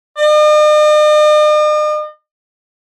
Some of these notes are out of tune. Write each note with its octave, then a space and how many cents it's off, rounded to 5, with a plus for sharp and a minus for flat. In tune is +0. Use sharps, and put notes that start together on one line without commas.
D#5 -45